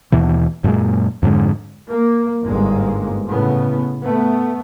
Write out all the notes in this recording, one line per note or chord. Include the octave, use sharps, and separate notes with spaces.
D#2 B2 E3
F#2 A#2 G#3
F2 G#2 D3 G#3
A#3
G1 G#2 G#3 A#3
A2 C#3 B3
A3 B3